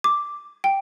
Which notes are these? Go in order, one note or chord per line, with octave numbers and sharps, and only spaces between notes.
D6
G5